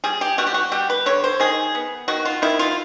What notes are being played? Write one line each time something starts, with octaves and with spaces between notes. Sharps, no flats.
G3 G#4
G4
G3 F#4
G4
F#4
G3 G4
B4
D3 C#5
C5
D#3 G#4
B3
D#3 F#4
F4
D#3 E4
F4